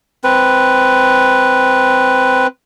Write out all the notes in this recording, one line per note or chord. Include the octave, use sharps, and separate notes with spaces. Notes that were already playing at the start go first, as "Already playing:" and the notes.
C4 B4